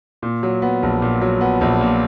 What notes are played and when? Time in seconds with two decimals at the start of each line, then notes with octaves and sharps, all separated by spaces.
0.22 A#2
0.43 F#3
0.62 B3
0.83 A#1
1.02 A#2
1.21 F#3
1.41 B3
1.61 A#1
1.81 A#2